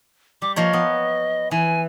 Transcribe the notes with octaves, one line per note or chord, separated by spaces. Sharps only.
G3 D6
F3 A#3 C#5 D#5
B3
E3 G#5